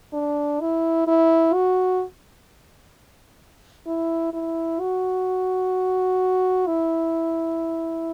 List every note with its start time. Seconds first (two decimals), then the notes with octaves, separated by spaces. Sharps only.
0.14 D4
0.60 E4
1.07 E4
1.54 F#4
3.87 E4
4.34 E4
4.80 F#4
6.67 E4